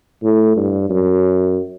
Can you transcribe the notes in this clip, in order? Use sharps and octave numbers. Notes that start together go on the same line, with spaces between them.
A2
G2
F#2